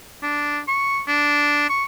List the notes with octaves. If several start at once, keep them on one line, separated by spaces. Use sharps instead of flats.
D4
C#6
D4
C#6